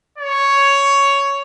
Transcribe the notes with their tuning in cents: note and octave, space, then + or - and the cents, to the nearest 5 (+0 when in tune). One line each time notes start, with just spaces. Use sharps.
C#5 +5